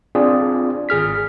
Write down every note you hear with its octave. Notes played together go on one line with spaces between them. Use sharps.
C4 D4 F4 G#4 D5
G#1 G#4 F6 B6